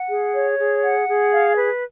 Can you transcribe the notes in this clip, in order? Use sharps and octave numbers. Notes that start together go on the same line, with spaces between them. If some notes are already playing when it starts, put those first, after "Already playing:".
Already playing: F#5
G#4
C#5
G#4
F#5
G#4
F5
B4